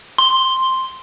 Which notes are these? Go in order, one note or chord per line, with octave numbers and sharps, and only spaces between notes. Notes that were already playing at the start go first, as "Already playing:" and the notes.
C6